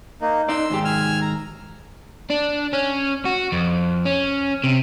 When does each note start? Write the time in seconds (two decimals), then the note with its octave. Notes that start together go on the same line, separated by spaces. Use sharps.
0.21 A#3 D#4
0.49 D#4 D5 C6 E6
0.70 D#2 G#2 G4
0.85 G#5 E6 F6
1.22 A#5
2.30 D4
2.73 C#4
3.26 F#4
3.52 F2
4.05 C#4
4.64 C3